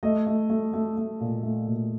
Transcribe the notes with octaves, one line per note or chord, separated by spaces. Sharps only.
A3 D#5
A3
A3
A3
A3
A#2
A3
A#2